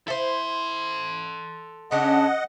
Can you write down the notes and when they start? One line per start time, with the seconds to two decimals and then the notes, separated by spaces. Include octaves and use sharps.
0.08 E4 A4 C5 C6
1.91 C#3 C#4 D4 D#5 F#5